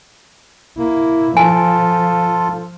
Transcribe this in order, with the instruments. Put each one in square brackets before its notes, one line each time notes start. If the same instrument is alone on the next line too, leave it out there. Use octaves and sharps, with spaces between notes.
[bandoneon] A#3 [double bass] E4
[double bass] F3 [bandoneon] F4 A4 [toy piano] G#5